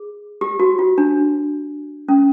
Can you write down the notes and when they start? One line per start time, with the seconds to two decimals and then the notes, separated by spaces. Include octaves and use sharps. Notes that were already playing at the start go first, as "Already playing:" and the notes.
Already playing: G#4
0.41 G4
0.60 F#4
0.79 F4
0.98 D4
2.09 C#4